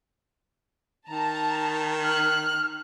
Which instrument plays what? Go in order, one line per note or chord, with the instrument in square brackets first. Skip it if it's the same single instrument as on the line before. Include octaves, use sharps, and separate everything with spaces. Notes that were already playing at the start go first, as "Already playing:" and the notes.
[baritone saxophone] D#3 [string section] A5 A#5
[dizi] F6 [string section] F#6